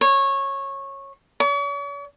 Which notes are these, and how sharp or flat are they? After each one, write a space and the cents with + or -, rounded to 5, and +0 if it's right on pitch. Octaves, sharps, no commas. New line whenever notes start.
C#5 -15
C#5 +45